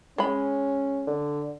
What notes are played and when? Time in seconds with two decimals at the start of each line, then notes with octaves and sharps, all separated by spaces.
0.18 G#3 C#4 B5
1.07 D3